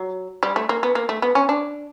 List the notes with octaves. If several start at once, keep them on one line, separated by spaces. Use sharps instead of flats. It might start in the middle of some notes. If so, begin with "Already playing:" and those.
Already playing: F#3
G3
A3
A#3
B3
A#3
A3
B3
C#4
D4